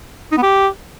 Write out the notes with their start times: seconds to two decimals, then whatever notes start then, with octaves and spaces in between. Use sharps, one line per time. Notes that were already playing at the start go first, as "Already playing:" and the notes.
0.31 D#4
0.37 B3
0.42 G4